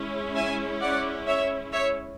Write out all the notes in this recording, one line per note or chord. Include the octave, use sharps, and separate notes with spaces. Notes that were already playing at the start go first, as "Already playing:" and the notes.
Already playing: G#3 C#4 E4
E5 G#5
D5 F#5
C#5 E5
C#5 E5